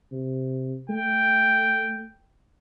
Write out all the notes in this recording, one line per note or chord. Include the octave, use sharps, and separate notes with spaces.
C3
A3 G5